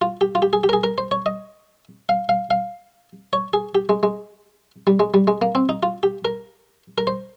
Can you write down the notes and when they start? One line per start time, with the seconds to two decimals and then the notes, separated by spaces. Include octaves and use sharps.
0.01 F4
0.21 G4
0.35 F4
0.42 G4
0.53 G#4
0.64 G4
0.69 A#4
0.73 G#4
0.84 A#4
0.98 C5
1.11 C#5
1.26 D#5
2.09 F5
2.29 F5
2.51 F5
3.33 C#5
3.53 G#4
3.75 G4
3.89 G#3
4.03 G#3
4.87 G3
5.00 G#3
5.14 G3
5.27 G#3
5.42 A#3
5.55 C4
5.69 D#4
5.83 F4
6.03 G4
6.25 A#4
6.98 A#4
7.07 C5